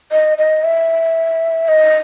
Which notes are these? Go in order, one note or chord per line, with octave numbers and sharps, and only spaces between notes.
D#5
D#5
E5
D#5